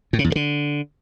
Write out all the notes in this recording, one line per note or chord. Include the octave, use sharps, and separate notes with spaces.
A2
C#3
E2
G2
D3